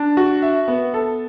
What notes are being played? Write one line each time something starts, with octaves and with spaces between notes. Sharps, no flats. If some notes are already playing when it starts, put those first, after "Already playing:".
Already playing: D4
F#4
E5
B3
A4